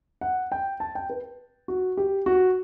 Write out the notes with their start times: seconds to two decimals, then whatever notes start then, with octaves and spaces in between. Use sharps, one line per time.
0.21 F#5
0.52 G5
0.80 A5
0.95 G5
1.10 B4
1.68 F#4
1.97 G4
2.26 F#4